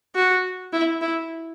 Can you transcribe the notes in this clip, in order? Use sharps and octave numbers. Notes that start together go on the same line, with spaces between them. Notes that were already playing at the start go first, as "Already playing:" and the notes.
F#4
E4
E4